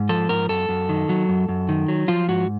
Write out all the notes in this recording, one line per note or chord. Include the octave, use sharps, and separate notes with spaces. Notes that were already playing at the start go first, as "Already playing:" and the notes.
Already playing: G#2
F3 A4
G#2 A#4
F#2 A4
F#2
D#3
F#3
F#2
F#2
D#3
F#3
F3 F4
G#2 F#4